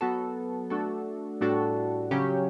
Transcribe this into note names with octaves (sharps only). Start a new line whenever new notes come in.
F#3 B3 F#4 A4
A3 D4 F#4 A4
A2 G3 D4 F#4 A4
C#3 F#3 C#4 G4